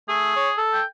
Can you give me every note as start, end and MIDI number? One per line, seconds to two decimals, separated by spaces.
0.09 0.33 57
0.09 0.59 68
0.36 0.50 73
0.58 0.81 69
0.73 0.85 79